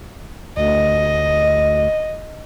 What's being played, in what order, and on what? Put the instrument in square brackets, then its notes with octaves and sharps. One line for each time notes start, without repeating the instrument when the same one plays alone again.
[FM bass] D2 [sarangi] D#5